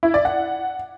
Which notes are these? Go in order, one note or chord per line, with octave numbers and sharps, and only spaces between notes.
E4
D5
F#5